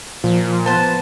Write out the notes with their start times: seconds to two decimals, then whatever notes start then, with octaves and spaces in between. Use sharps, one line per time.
0.24 A#2 F3
0.66 B3 C5 A5